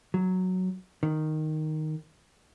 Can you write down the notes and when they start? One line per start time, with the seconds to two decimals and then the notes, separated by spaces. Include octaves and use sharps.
0.14 F#3
1.03 D#3